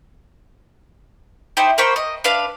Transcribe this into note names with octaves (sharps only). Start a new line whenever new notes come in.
D#4 E4 G4 C5
A#3 C5 B5 C#6
D#5
D4 B4 F5